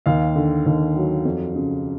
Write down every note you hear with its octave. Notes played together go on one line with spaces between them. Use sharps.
D#2 F5
D3
D#2
F#3
F2
C#3